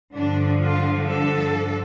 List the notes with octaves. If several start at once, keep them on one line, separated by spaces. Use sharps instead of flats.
G2 D3 F3 D4
F4
A4